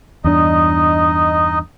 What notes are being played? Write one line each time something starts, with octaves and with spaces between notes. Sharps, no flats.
E2 G2 D4 D#4 D#5